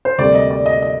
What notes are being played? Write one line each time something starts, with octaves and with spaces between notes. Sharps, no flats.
C5
D2 C3 G3 A#3 D5
D#5
D5
D#5
D#5